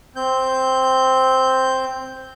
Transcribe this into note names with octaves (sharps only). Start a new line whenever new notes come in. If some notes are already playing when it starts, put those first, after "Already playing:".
C4 G6